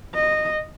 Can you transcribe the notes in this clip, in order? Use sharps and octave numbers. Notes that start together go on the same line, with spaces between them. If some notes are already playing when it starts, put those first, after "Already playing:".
D#5